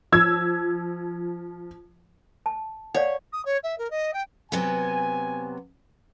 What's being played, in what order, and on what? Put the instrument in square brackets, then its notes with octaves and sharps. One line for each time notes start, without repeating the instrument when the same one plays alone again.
[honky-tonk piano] F3 E6 G#6
[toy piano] A5
[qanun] C#5 [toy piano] D5 F5 F#5
[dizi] D#6
C#5
E5
A#4
D#5
G5
[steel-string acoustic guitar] C3 F#3 B3 [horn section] G#5